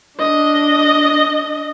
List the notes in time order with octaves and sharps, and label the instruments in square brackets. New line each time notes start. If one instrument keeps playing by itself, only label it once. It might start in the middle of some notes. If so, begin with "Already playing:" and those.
[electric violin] D4 D#5